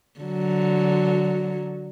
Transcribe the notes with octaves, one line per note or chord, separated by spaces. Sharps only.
D3 F#3